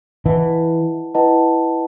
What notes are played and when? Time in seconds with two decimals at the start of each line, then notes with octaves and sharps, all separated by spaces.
0.25 E3 E4 B4 D#5 F#5 A5
1.15 E4 B4 D#5 F#5 A5